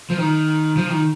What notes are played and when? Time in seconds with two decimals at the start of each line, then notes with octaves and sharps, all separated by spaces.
0.10 F3
0.18 D#3
0.77 F3
0.90 D#3